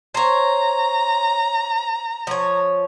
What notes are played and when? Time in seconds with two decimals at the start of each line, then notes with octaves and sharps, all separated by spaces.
0.14 C5 C#5 A#5
2.27 F3 C#5